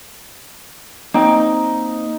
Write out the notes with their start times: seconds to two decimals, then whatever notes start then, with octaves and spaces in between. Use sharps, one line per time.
1.14 A#3 C4 D#4 G5